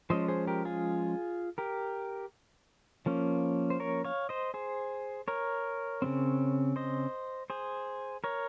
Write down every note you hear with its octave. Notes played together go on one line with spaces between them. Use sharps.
F3 G#3 C#4 C5 D#5
G#4 C5
G4 A#4
F4 G#4
G4 A#4
F3 A#3 C#4
C5
A#4 C#5
C#5 F5
C5 D#5
G#4 C5
A#4 C#5
C#3 G3 C4
C5 D#5
G#4 C5
A#4 C#5